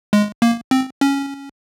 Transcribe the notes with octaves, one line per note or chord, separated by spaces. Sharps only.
G#3
A#3
C4
C#4